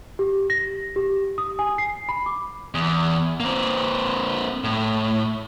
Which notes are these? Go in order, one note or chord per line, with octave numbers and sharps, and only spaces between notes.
G4
A#6
G4
D#6
G#5
C7
B5
D6
E2
A#3 C4
A2